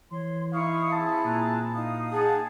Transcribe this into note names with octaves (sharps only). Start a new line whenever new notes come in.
E3 C#5 C6
D#4 E4 F5 C#6 D#6
C4 G#4 A5
A#2 A#5 F#6
D#4 F5 D#6
G#4 F#5 G5 A5